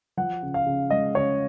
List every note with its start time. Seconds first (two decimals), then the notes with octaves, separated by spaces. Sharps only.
0.17 F3 F#5
0.43 C#3
0.54 F5
0.66 C#3
0.90 G#3 D#5
1.15 C#3 C#5